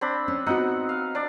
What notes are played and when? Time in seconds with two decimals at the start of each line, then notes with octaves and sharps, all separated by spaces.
0.01 C4 D4 B5
0.28 C#4
0.46 B3 C4 D#4 F#4 F#5 E6
0.89 F5
1.15 D4 D5